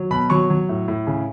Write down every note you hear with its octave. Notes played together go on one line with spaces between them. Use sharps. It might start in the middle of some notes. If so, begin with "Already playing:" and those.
Already playing: F#3
B2 B5
F#3 C#6
F#3
A2
A2
C#3